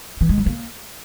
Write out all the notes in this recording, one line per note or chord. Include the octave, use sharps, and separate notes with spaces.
E3
G#3
F#3
A#3